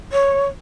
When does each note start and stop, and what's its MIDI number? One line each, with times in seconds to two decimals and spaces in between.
0.11 0.44 73